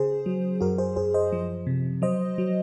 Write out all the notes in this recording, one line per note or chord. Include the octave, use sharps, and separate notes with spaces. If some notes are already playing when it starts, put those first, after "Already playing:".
Already playing: C#3 G#4 C5
F#3
F#2 F#4 A#4
G#4 C5
F#2 G#4 C5
C5 D#5
F3
C3
F#3 C5 D#5
F#3